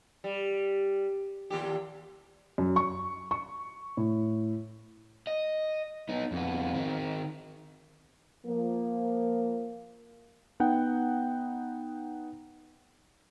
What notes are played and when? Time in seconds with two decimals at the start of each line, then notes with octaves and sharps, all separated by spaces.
0.24 G3
1.50 D#2 A#2 G4
2.58 F#2
2.76 C#6
3.31 C#6
3.97 A2
5.27 D#5
6.09 B3 D#4
6.32 F2 B3
6.74 D#3 C4
8.45 F3 A#3
10.60 B3 D#4 F#5 G5